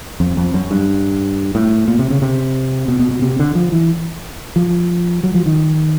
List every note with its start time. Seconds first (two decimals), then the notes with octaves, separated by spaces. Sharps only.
0.20 F2
0.37 F2
0.54 F#2
0.71 G2
1.55 A2
1.88 A#2
1.99 C3
2.10 C#3
2.22 C3
2.88 B2
2.99 B2
3.11 B2
3.22 C3
3.39 D3
3.55 F3
3.72 E3
4.56 F3
5.23 F#3
5.34 F3
5.46 D#3